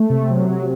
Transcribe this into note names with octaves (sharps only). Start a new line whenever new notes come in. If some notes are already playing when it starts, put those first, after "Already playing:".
Already playing: A3
C3
F#3
C3